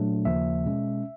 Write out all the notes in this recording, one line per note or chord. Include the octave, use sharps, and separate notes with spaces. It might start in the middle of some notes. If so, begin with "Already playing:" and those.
Already playing: A#2 F#3 A3 D4
D#2 C#3 F3 A#3 E5
B2 G#3 C#4